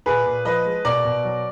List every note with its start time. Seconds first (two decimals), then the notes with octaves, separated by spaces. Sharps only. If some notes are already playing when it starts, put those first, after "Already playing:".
0.06 A#2 G#4 B4
0.26 A#2
0.45 F3 B4 D#5
0.66 G#3
0.85 B2 A#4 D5
1.05 B2
1.24 F#3